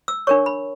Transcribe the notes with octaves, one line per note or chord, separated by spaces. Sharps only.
E6
D4 A#4 C#5 C#6
B5